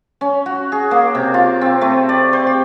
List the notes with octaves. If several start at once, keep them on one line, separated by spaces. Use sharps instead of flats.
C#4
F#4
G#4
A#3
C3
F4
C4
A3
D5
C5
G4